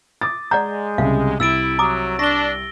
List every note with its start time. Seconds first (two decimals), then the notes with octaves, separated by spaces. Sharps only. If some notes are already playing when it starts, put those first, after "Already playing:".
0.21 D6 D#6 A6
0.51 G#3 D5 F#5 A#5 G6
0.98 C2 C#3 F5
1.40 C2 E4 E6 A6 D7
1.79 F#3 A#5 D6 D#6
2.19 D4 C#6 A#6 G7